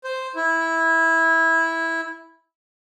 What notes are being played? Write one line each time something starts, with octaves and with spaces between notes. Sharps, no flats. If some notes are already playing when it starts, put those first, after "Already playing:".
C5
E4